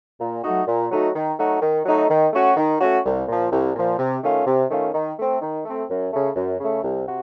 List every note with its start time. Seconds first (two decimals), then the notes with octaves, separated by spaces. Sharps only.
0.19 A#2
0.43 F#3 A3 D#4 F#4
0.67 A#2
0.91 F#3 A3 D#4 F#4
1.14 D#3
1.38 F#3 A3 D#4 F#4
1.61 D#3
1.85 F#3 A3 D#4 F#4
2.09 D#3
2.33 A3 C#4 F#4
2.56 D#3
2.80 A3 C#4 F#4
3.04 C2
3.27 A#2 F3
3.51 C2
3.75 A#2 F3
3.98 C3
4.22 D#3 A3 C#4 F4
4.45 C3
4.69 D#3 A3 C#4 F4
4.94 D#3
5.18 A3 C4
5.41 D#3
5.65 A3 C4
5.89 F#2
6.12 C#3 A3
6.36 F#2
6.59 C#3 A3
6.83 C2
7.06 C3 F#4